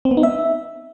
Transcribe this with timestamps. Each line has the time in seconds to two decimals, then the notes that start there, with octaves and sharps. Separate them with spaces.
0.05 C4
0.11 B3
0.17 D#4
0.23 E5